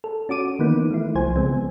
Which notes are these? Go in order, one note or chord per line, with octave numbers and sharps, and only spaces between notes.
A4
C#4 F#4 D6 D#7
D#3 E3 A#3 B3 D#4
A3 E4
C2 F3 C5 G#5
C#3 G#3 B3 C4